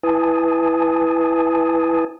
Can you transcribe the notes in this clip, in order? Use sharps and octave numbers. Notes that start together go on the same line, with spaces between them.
E4 B4 G#5 A5 D#6